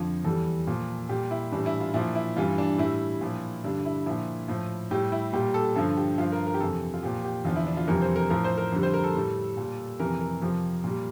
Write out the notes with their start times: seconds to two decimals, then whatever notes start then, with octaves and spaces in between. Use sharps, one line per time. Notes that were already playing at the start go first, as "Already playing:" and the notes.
Already playing: F2 D3 F3
0.24 E2 E3 G3 A4
0.67 A#2 F3
1.09 A#2 G3 G4
1.31 E4
1.52 A2 E3 G3 D4
1.66 E4
1.80 F4
1.94 A#2 F3 E4
2.15 E4
2.36 G2 E3 G3 F4
2.58 D4
2.78 A2 G3 E4
3.21 A#2 F3
3.64 G2 D3 G3 D4
3.85 E4
4.06 A#2 F3 E4
4.48 A2 F3
4.91 A2 G3 G4
5.12 E4
5.33 A#2 G3 G4
5.54 A4
5.76 G2 D3 F3 A4
5.97 G4
6.18 G2 F3 F4
6.32 A#4
6.47 A#4
6.54 G4
6.60 F2 C3 E3 A4
6.94 F4
7.03 A#2 F3 G4
7.24 G4
7.45 E2 D3 F3 F4
7.56 E4
7.67 D4
7.77 F4
7.88 F2 C3 E3 G3 A#4
8.02 C5
8.16 A#4
8.30 A2 F3 A#4
8.44 C5
8.58 A#4
8.72 F2 D3 G3
8.83 C5
8.94 A#4
9.04 A4
9.15 A2 G3
9.57 A#2 G3
10.00 F2 C3 E3 G3 A#4
10.20 A#4
10.42 F2 C3 F3
10.84 A#2 G3